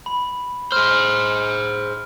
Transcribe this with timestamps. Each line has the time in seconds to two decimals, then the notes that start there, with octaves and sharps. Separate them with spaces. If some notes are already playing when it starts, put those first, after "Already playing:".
0.06 B5
0.72 G#4 C5 F6